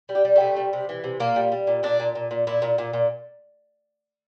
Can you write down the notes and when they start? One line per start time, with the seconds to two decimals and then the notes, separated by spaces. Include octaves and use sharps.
0.09 G3
0.15 G4
0.25 G3
0.36 C3 A3
0.56 G3
0.73 C3
0.89 E3
1.04 C3
1.20 A#2 A#3
1.36 G3
1.52 G3
1.67 A#2
1.83 A#2 D4
2.00 A#2
2.15 A#2
2.31 A#2
2.47 A#2 E4
2.62 A#2
2.78 A#2
2.93 A#2